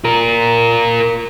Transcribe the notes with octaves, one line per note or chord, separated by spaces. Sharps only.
F4 A#4